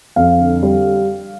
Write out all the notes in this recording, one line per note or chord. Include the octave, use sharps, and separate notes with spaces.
F2 F5
D3
G3